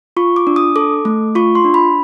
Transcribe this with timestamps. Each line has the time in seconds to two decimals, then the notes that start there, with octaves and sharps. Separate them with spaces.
0.17 F4 C#6
0.36 D6
0.47 D4
0.56 D#6
0.76 A4 D6
1.05 A3
1.35 F4 C#6
1.55 C6
1.64 D4
1.74 B5